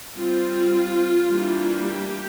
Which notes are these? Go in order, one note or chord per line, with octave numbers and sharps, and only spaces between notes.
G3 C4 F4
E3 G3 A#3 D4
G4